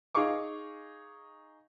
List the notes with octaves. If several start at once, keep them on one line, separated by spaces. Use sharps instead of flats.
D#4 G#4 F5 C#6 D6